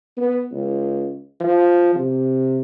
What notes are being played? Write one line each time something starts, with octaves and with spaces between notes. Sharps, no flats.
B3
C#2
F3
C3